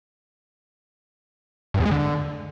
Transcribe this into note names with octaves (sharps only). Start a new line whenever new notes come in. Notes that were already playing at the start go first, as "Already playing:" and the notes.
G2
E2
G#3
D3